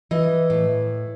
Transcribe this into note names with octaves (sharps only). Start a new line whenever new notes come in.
E3 D#5
A2